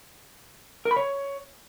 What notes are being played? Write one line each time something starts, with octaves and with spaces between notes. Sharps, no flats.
A#4
B5
C#5